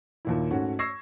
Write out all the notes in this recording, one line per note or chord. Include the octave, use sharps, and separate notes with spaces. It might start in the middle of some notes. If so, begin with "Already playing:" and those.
D#2 A#2 E4
G#2 A3 C#4 F#4
C#6 E6 G#6 A#6 C7